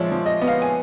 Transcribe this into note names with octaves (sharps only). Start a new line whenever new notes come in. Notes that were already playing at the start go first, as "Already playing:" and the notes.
Already playing: A#2 F3 G#3 C#5 D5 E5
F3
D#5
B3
F5
G#5